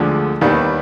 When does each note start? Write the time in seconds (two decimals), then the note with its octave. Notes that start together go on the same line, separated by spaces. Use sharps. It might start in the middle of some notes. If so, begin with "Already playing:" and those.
Already playing: D2 D3 F3 G#3
0.41 D#2 D#3 G3 B3 D4